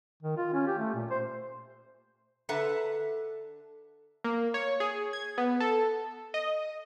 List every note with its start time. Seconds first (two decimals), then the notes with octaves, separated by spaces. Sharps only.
0.23 D#3
0.37 F4
0.54 C#4
0.67 G4
0.78 A3
0.95 A#2
1.10 C5
2.49 D3 A4 B4 E5 F#5 A#5
4.24 A#3
4.54 C#5
4.80 G#4
5.13 G#6
5.38 B3
5.60 A4
6.34 D#5